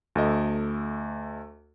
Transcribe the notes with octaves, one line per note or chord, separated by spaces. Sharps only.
D2 A3 D#5